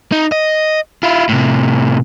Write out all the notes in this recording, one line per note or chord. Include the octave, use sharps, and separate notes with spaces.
D#4
D#5
E4 F4
A2 C3